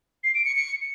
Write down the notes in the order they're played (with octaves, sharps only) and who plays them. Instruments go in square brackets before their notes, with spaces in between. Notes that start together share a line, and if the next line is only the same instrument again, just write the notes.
[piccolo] C7
D7
C#7
C#7